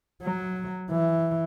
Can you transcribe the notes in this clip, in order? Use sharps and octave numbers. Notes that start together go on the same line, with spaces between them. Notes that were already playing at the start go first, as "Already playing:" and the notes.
F#3
E3